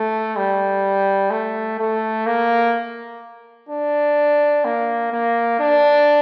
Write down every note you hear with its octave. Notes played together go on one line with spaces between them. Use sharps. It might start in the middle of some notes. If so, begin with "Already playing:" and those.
Already playing: A3
G3
A3
A3
A#3
D4
A#3
A#3
D4